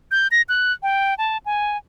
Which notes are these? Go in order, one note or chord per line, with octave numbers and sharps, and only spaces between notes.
G6
A#6
F#6
G5
A5
G#5